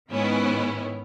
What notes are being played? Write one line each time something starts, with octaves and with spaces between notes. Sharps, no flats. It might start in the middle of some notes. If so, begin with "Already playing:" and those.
G#2 D#3 B3 C#4 E4